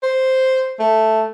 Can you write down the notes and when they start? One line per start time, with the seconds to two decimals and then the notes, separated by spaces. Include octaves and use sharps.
0.03 C5
0.79 A3